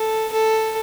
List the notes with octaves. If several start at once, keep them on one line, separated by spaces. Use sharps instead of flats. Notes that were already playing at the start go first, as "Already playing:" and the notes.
Already playing: A4
A4